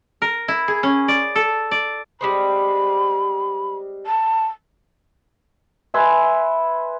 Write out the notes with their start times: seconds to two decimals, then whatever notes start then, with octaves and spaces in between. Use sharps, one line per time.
0.22 A#4
0.48 E4
0.68 G#4
0.83 C#4
1.08 D5
1.35 A4
1.71 D5
2.21 G3 G#3 C4 B5
4.06 A5
5.94 B4 E5 G#5 C6